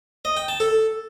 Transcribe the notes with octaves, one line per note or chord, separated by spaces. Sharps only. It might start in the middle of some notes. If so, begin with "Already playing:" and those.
D#5
G5
A5
A4